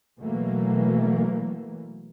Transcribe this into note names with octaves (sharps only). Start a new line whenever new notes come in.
B2 E3 F#3 A3 A#3